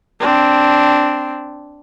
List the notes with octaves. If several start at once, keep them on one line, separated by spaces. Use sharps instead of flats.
C4 D4